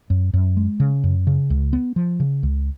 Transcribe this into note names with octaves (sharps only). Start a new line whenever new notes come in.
F#2
F#2
G#3
C#3
F#2
C#3
C#2
B3
F3
C#3
C#2